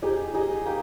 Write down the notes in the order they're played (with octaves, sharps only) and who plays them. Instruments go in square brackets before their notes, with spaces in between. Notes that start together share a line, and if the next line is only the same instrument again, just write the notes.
[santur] D#4 G#4 D#5 [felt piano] G4
[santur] D#4 G#4 D#5 [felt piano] G4
[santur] A#3 D#4 G4